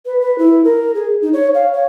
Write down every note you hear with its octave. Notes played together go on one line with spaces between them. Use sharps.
B4
B4
E4
A#4
G#4
D#4
C#5
F5
C#5